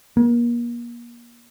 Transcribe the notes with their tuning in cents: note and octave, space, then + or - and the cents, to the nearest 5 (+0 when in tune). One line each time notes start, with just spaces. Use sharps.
A#3 +35